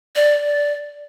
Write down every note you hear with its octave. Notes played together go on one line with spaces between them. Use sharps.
D5